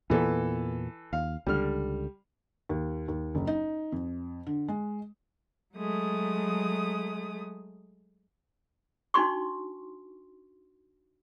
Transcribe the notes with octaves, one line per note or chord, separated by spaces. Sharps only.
E2 A#2 E3 B3 A4
D#2 F5
C#2 D3 G3 F6
D#2
D#2
F#1
D#4
F2
D3
G#3
F#3 G#3 A3 D#6
D4 D#4 F#4 C6 C#6